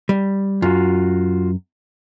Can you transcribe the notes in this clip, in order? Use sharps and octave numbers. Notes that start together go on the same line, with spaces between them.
G3
F#2 F4 F#4